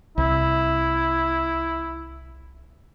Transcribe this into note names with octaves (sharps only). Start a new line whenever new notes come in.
C2 E4